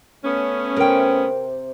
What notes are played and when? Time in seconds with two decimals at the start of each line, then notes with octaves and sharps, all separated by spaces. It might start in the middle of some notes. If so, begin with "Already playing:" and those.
0.24 A3 B3 C#4
0.77 C3 A#4 G5